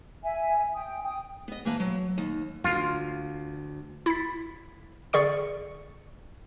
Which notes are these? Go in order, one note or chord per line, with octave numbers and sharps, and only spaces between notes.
E5 G#5
G5 D#6
G5 D#6
B3 D#5
E3 A#3 B4 A5
F#3
D#2
D2 F4
E4 A6 B6
D3 G#4 D5 C#6 C#7